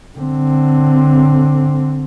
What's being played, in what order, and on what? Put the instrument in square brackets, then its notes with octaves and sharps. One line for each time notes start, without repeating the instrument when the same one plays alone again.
[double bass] D3 C4